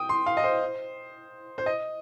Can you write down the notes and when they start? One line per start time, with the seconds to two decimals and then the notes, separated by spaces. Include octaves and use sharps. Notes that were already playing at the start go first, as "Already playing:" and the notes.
Already playing: G5 D#6
0.09 C6
0.26 F5
0.37 D#5
0.44 C5
1.58 C5
1.66 D#5